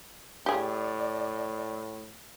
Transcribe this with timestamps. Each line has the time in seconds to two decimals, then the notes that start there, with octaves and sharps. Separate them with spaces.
0.46 A2 G4 G#4 D5